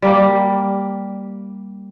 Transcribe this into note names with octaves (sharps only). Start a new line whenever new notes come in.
G3 A#3 G4